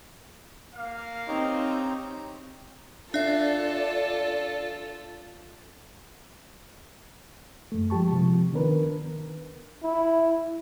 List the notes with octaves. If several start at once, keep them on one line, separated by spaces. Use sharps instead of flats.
A#3 F5
C4 D#4 G4 C#5 A#5
D4 F4 A4 D5 E5
F#2 A3
F3 G#3 G4 A5 C#6
C3 F3
D#3 B3 D4 A#4 B4
E4